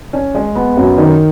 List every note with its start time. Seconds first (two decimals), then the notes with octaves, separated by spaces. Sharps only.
0.13 C#4
0.35 G#3
0.55 B3
0.77 F#2
0.98 D#3